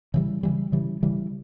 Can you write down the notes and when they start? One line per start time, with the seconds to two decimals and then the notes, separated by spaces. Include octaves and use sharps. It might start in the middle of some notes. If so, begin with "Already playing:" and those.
0.14 C#3 E3 G3
0.43 C#3 E3 G3
0.72 C#3 E3 G3
1.03 C#3 E3 G3